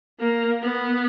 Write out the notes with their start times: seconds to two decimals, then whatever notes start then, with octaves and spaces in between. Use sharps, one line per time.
0.20 A#3
0.62 B3